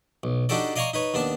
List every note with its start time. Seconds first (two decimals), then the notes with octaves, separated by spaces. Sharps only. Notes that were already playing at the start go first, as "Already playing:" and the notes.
0.23 B1
0.49 D4 D#4 F#4 G4 A4 D5
0.76 D5 D#5 F5 G#5 A#5 C#6
0.94 D#4 B4 C#5
1.14 D#2 B3 D4 A5